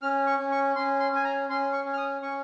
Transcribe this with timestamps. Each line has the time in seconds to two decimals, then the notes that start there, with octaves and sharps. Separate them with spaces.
0.02 C#4 F6
0.27 C#6
0.39 C#4
0.52 C#6
0.76 C#4 C6
1.00 C6
1.13 C#4 G#5
1.24 A#5
1.49 C#4 C6
1.73 C#6
1.85 C#4
1.93 F6
1.97 D#6
2.22 C#4 C#6